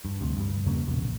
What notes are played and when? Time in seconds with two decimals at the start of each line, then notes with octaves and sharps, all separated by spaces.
0.05 G2
0.21 D2 C3
0.37 G2 G3
0.65 E2 C#3 A#3 C#4
0.87 A#1 E2 G2 B2
1.02 A#1